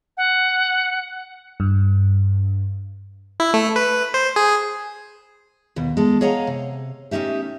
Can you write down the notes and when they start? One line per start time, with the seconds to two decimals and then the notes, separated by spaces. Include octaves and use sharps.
0.17 F#5
1.60 G2
3.40 E4
3.54 A3
3.76 B4
4.14 C5
4.36 G#4
5.76 D#2 B2
5.97 G#3 A4
6.21 G#4 C#5 D#5 F5 F#5 A#5
6.47 C3
7.11 A3 C#4 D#4 G4 E5